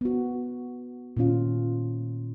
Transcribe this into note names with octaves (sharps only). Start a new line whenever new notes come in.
B3 F#4
A#2 D#3 C#4 F4